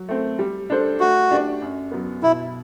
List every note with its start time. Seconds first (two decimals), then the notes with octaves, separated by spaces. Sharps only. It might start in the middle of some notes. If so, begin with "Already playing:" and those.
Already playing: F#3
0.09 A3 C4
0.39 G3
0.70 D4 A4 C5
1.00 A3 F#4
1.31 D4 G4 D5
1.62 F#2
1.91 F#3 B3
2.23 B2 E4